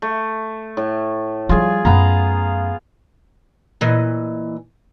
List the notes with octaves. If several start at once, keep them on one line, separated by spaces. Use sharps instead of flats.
A3
A2
F3 G3 F4 G#4
F#2 A3 B3 F5 A#5
A#2 E3 D#5